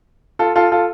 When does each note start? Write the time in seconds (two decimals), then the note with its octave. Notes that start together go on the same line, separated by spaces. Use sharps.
0.39 F4 A4
0.56 F4 A4
0.72 F4 A4